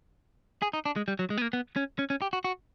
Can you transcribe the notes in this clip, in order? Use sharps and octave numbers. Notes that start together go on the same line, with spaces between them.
G#4
D#4
D4
G#3
G3
F#3
G#3
B3
A#3
B3
C#4
C#4
C#4
G4
F#4
F#4